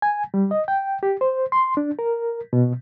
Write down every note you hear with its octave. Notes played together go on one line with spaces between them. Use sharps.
G#5
G3
D#5
G5
G4
C5
C6
D4
A#4
B2